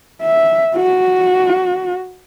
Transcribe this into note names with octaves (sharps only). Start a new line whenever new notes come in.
E5
F#4